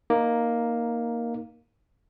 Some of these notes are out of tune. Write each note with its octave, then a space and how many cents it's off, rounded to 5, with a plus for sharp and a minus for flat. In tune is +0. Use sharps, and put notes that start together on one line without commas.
A#3 +5 D#4 -5